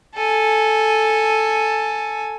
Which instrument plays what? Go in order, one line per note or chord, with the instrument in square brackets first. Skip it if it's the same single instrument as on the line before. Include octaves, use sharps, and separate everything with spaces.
[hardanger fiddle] A4 G#5